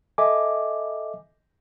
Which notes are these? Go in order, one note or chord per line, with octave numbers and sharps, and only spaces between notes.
A4 D#5 E5 G#5 D6